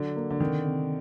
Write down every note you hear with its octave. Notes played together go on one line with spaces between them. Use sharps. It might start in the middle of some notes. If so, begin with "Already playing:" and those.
Already playing: D3 F#3
A#3
D3
C3 D#3
C3